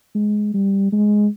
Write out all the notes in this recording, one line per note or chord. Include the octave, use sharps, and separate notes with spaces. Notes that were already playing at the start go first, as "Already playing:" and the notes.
G#3
G3
G#3